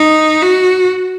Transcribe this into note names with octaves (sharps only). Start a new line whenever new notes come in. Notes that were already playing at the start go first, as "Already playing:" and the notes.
Already playing: D#4
F#4